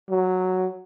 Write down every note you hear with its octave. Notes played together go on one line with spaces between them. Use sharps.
F#3